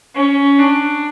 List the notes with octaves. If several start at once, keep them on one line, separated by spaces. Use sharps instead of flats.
C#4
D4